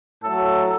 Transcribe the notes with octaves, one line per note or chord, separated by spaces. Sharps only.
A2 F#3 A4